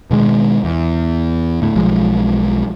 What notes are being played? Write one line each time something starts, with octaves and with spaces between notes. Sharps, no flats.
B2 D#3 G#3
E2
D2 A2
B1 F3 G#3